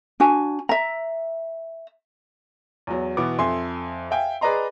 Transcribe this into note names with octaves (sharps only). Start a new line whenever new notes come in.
D4 F#4 G#5
E5 A#5
E2 F#3
B2 E3 B3 D6
F2 A4 E5 G#5 C6
E5 F5 G5 G#5
G#4 B4 D5 D#5 A#5 C6